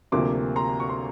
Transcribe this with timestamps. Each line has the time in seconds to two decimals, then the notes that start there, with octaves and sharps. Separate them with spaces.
0.12 D2 C3 F3 A#3 C6 D6
0.56 A#5 C6
0.80 C#6
0.90 C6